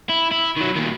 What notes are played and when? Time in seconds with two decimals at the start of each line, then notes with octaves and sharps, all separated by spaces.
0.09 E4
0.32 E4
0.57 D#3 F#3
0.76 A#2 D#3